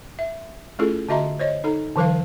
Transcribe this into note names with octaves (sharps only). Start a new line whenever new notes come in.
E5
A3 C#4 E4 F4 G#4 A4
D3 F#4 D#5 E5 A#5 C6
C5 C#5 D#5
D#4 A4 A#5
D3 E3 F#3 A#4 C5 F5